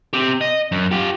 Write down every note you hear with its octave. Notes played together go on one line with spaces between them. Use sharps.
C4 G4
D#5
F#2
F4 G4